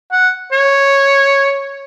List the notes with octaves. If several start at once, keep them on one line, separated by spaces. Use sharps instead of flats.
F#5
C#5